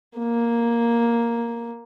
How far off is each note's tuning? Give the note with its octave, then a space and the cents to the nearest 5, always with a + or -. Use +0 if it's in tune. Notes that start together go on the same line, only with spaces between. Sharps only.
A#3 +5